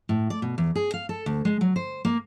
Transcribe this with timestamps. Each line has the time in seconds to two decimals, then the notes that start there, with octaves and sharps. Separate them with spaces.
0.09 A2
0.30 D5
0.42 B2
0.58 E2
0.75 G#4
0.94 F5
1.09 A4
1.26 D2
1.45 G#3
1.61 F#3
1.76 C5
2.05 A#3